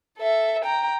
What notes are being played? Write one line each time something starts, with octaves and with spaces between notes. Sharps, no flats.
A4 E5
G5 A#5